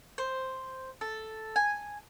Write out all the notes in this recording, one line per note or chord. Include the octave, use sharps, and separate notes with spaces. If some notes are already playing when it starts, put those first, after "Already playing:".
C5
A4
G#5